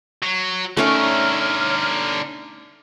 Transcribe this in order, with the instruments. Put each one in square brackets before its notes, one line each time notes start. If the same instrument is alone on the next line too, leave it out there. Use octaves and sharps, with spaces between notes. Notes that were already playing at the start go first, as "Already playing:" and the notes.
[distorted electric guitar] F#3
[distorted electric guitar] D3 A#4 [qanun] A3 C#4 D#4 [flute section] C#5 F6